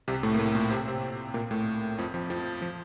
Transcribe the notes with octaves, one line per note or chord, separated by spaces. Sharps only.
C2 C3
A2 A3
A#3
A2 A3
A#2 A#3
C3 C4
C3 C4
A#2 A#3
A2 A3
F2 F3
F2 F3
F2 F3
F3